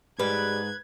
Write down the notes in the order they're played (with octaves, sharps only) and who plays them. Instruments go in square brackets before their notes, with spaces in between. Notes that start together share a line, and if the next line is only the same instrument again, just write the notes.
[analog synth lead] G#2 [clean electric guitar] G4 G#4 D5 [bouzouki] B4 [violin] G#6